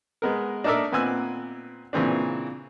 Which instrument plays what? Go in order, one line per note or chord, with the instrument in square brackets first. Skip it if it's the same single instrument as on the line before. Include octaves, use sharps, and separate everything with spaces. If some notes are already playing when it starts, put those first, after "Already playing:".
[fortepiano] G#3 B3 A#4
D4 D#4 A4 A#4 D5 E5
A#2 B3 C4 G#5 E6 F#6
A#2 C#3 E3 C4 D4